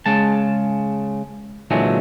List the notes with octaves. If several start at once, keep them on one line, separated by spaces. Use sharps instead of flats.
C#3 G#3 A5
A#2 D3 E3 F#3 G#3 A3